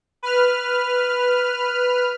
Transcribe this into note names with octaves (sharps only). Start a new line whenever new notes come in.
B4 F6